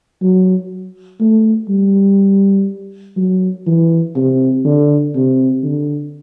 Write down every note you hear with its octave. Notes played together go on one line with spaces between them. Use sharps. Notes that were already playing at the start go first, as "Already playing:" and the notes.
F#3
A3
G3
F#3
E3
C3
D3
C3
D3